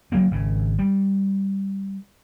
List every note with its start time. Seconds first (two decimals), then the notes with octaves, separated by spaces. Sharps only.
0.12 D#3 F#3 A#3 B3
0.31 G#1 C#3
0.79 G3